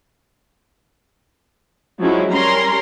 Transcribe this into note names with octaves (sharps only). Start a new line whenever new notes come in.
F3 F#3 G#3 C#4 E4
G3 C#4 A#4 A#5 C6